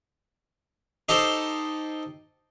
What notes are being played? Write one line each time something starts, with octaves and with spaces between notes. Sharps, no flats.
D#4 G4 A4 C5